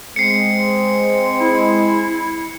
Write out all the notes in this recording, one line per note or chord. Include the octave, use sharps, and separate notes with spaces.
G#3 C4 C7 C#7
E4